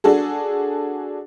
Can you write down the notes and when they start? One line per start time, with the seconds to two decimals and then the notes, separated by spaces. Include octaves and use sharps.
0.04 D4 F#4 G#4 A4